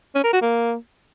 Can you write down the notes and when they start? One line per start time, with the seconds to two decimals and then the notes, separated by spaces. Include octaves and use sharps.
0.15 C#4
0.24 A#4
0.33 F#4
0.42 A#3